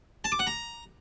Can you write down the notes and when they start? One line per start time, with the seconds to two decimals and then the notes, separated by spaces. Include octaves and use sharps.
0.24 A5
0.32 D6
0.39 F#5
0.47 A#5